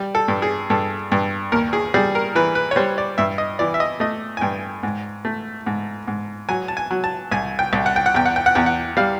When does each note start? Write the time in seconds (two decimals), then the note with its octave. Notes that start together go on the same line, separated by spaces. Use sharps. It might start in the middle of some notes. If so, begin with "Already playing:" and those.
Already playing: G3
0.15 A4
0.28 G2
0.42 G#4
0.70 G2 A4
1.12 G2
1.52 D#2 A#4
1.73 G#4
1.94 G3 G#4
2.15 A#4
2.35 E3 B4
2.55 B4
2.71 C#5
2.76 G3 C5
2.98 D5
3.18 G2 E5
3.38 D#5
3.59 E3 D5
3.74 E5
3.80 D#5
4.00 A3 D#5
4.37 G#5
4.41 G2 G5
4.83 G#2
5.25 A3
5.67 G#2
6.08 G#2
6.49 F#3 G#5
6.68 A5
6.77 G#5
6.91 F#3
7.04 A5
7.32 C2 G#5
7.59 G5
7.73 C2
7.86 F#5
7.96 G5
8.06 F#5
8.15 E2 G5
8.26 F#5
8.36 G5
8.46 F#5
8.55 E2 G5
8.66 F#5
8.97 G3 F5